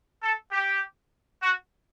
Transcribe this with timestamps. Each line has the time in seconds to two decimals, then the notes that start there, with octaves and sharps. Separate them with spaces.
0.22 A4
0.52 G4
1.42 F#4